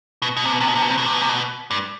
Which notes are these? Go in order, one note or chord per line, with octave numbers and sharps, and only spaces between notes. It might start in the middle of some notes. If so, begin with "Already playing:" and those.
B2
B2
C3
B2
C3
B2
C3
B2
C3
B2
C3
B2
C3
B2
G2